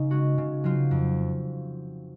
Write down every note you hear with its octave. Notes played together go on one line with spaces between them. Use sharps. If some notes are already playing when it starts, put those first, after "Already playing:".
Already playing: C#3 D#4
G#3 C#4 F#4
C#3
F#3 C4 F4
F2